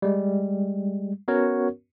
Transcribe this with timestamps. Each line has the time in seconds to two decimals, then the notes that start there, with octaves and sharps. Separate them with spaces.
0.02 G3 G#3
1.28 B3 C#4 F#4 A#4 C#5